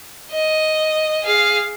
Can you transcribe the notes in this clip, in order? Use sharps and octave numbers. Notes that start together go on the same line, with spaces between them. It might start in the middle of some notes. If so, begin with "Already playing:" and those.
D#5
G#4 F5